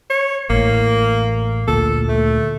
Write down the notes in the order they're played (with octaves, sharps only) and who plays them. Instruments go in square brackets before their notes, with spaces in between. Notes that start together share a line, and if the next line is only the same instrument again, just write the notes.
[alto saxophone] C#5
[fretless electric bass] A1 A2 [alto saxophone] A#3
[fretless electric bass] D2 A#2 [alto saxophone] A4
[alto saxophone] A3